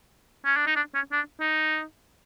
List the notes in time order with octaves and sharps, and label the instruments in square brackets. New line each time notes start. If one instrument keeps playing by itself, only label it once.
[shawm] C#4
D4
D#4
D4
C#4
D4
D#4